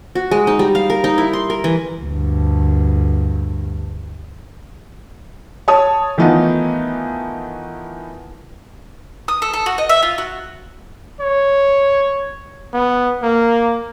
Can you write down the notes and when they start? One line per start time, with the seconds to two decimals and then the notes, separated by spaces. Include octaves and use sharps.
0.15 F#4
0.31 G#3
0.47 D#4
0.59 G3
0.75 F5
0.90 A#4
1.04 D#4
1.18 E4
1.33 C6
1.50 A#4
1.64 E3
2.01 D2 G2
5.68 C#5 A5 D#6
6.18 D#3 E3 A3 B3 D#4 F4
9.28 D#6
9.42 A4
9.53 A4
9.66 F#4
9.78 D#5
9.89 E5
10.02 F4
10.18 F#4
11.20 C#5
12.74 B3
13.23 A#3